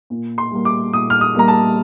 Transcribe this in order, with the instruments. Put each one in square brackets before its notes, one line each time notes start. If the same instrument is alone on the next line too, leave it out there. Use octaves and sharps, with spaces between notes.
[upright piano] A#2
C6
G3 A#3
D6
A#2 D#6
F6
D#6
G3 A#3 A#5
A5